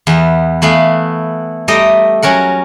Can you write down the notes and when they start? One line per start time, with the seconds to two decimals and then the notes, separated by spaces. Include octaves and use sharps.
0.07 E2 B3
0.62 E3 A3 B3 F5
1.68 G3 A3 D#5 G5 A#5
2.22 F#3 C#4 A#4 F#5